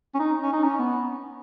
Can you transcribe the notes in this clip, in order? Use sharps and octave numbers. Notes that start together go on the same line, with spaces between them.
C#4
D#4
C#4
D#4
C#4
B3